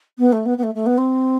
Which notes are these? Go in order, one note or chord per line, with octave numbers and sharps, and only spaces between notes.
B3
A3
B3
B3
A3
A3
B3
C4